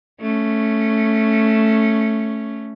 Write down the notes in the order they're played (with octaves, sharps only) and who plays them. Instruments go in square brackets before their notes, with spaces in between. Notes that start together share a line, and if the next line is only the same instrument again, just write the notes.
[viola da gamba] A3 C#4